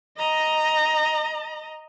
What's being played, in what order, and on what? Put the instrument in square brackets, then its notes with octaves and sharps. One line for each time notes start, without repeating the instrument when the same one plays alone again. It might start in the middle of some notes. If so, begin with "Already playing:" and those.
[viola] D#5 A#5